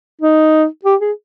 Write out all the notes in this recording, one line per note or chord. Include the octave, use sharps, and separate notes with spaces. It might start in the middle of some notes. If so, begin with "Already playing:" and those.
D#4
G4
G#4